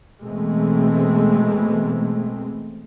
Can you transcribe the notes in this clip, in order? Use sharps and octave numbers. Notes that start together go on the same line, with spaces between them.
B2 E3 G#3 A3 C4